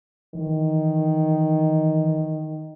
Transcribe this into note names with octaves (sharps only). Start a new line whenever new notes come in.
D#3 E3